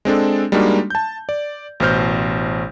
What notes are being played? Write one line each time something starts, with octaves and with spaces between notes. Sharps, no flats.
G#3 C4 D4 A4
G3 G#3 A#3 D4 D#4 F#4
A5 G6
D5
A1 B2 C5 F6 G6